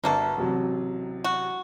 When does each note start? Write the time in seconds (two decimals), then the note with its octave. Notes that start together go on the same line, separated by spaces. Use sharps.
0.04 G1 B2 A#3 A4 E5
0.37 A1 C3 F#3
1.24 F#4